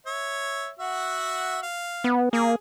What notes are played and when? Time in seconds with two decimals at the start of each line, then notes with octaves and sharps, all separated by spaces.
0.06 C#5 E5
0.79 F#4 E5 F#5
1.62 F5
2.04 B3
2.33 A#3 G#4